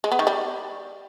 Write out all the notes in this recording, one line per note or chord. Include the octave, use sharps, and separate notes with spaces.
G#3
B3
D#3
G3